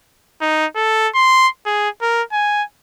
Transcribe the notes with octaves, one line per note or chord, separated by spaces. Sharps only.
D#4
A4
C6
G#4
A#4
G#5